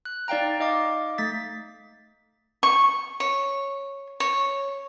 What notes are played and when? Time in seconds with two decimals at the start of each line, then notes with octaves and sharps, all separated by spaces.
0.05 F#6
0.28 D#4 D5 F5 G5 A#5
0.60 D#4 D#5 F5 D6
1.18 A3 A6 B6
2.63 C#6
3.20 C#5
4.20 C#5